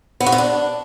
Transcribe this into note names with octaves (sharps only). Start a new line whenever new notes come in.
B3
F#4
B3
D4